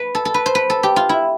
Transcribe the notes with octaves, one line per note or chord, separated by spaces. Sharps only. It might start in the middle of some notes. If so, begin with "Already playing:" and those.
Already playing: B4
A4
A4
B4
C5
B4
A4
G4
F4
E4